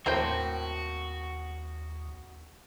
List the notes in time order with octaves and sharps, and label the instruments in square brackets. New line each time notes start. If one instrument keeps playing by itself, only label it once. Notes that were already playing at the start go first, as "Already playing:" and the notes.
[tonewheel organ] D#2 [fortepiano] A2 C5 [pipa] A#3 C4 G5 [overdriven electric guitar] F#4